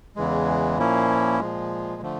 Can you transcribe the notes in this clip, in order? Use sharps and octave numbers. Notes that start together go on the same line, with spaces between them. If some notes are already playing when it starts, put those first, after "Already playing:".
E2 C#3 E3 G#3
A#2 F3 A#3 C#4 E4
A#2 F3 G#3
D3 F3 A3